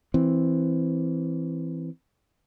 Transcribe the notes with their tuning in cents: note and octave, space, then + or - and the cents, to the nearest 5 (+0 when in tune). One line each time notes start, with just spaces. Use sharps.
E3 +0 C4 +0